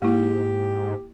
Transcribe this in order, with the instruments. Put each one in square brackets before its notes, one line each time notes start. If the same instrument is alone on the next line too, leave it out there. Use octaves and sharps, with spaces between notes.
[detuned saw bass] G#2 [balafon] A#3 E4 [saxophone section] G4